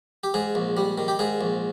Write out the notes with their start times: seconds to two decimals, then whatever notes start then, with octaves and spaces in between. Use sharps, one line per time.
0.24 G4
0.34 G#2 G#4
0.55 A#1
0.77 G3
0.98 D#3
1.08 G4
1.19 G#2 G#4
1.41 A#1